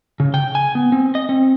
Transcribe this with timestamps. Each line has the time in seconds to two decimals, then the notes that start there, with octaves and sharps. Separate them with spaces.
0.20 C#3
0.34 G5
0.55 G#5
0.75 B3
0.92 C4
1.15 D#5
1.29 C4